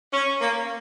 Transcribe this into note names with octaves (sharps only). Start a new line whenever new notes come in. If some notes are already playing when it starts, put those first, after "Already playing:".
C#4
A#3